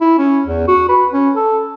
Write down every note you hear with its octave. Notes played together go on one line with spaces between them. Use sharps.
E4
C#4
E2
F#4
B4
C#4
A4